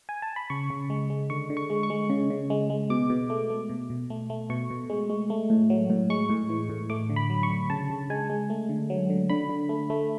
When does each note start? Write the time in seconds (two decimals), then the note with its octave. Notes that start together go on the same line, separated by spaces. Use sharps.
0.09 G#5
0.22 A5
0.36 B5
0.50 C#3 C#6
0.70 C#3
0.90 G#3
1.10 G#3
1.30 D3 C#6
1.50 D3
1.57 C#6
1.70 G#3
1.83 C#6
1.90 G#3
2.10 C#3
2.30 C#3
2.50 G#3
2.70 G#3
2.90 B2 D6
3.10 B2
3.30 A3
3.50 A3
3.69 B2
3.90 B2
4.10 A3
4.30 A3
4.50 B2 C#6
4.70 B2
4.90 G#3
5.10 G#3
5.30 A3
5.50 A2
5.70 F#3
5.90 A2
6.10 G#3 C#6
6.30 A2
6.49 E3
6.70 A2
6.90 A3 D6
7.10 D3
7.16 B5
7.30 F#3
7.43 C#6
7.50 D3
7.70 C#3 A5
7.90 C#3
8.10 G#3 G#5
8.30 G#3
8.50 A3
8.69 D3
8.90 F#3
9.10 D3
9.30 D3 B5
9.49 D3
9.69 A3
9.90 A3